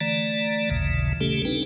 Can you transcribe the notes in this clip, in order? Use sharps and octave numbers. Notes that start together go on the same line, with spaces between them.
D3 E3 A3 D5 A#5
A1 D#2 A#2 C#3 E3
C#3 G3 A3 C#4 G4 A4
C4 D4 D#4 A4 B4 G5